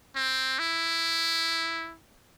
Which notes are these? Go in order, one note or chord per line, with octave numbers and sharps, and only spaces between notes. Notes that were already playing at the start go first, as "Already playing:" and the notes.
C4
E4